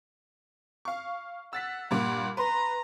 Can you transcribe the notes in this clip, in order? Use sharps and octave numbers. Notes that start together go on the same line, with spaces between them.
F5 C#6
F#5 E6 A6 B6
G2 A#2 A#3 F#5
B4 A#5 C6